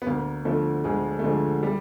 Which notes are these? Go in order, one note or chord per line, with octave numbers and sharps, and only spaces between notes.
B3
D2 A#3
D3 F3 A3
D2 G#3
A3
D3 F3 G#3
G3